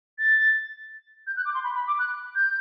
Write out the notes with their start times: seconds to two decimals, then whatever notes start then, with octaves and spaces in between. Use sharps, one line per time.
0.19 A6
1.27 G6
1.37 F#6
1.45 D6
1.54 C6
1.64 B5
1.75 B5
1.87 D6
1.99 F#6
2.35 G6